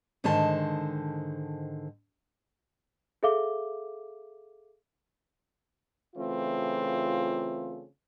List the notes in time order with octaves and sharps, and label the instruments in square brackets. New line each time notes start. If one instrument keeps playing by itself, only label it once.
[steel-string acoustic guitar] G#2 D3 D#3 C5 D#5 A5
[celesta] G#4 A4 E5 F5 D6 G7
[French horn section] C#3 E3 A3 C4 F4